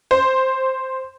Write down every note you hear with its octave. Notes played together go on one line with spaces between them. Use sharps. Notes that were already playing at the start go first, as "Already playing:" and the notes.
C5